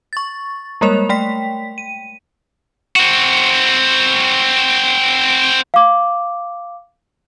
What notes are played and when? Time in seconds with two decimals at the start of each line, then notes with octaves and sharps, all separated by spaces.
0.13 C#6 A6
0.81 G3 G#3 A#3 A#4 C#5 F7
1.09 A3 G5 B6
1.78 D#7
2.96 C4 F#4
5.74 F5 D6